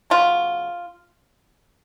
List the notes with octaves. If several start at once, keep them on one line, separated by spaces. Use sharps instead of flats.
C#3 F#3 B3 F4